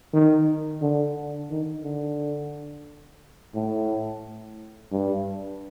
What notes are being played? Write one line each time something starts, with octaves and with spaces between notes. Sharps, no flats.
D#3
D3
D#3
D3
A2
G2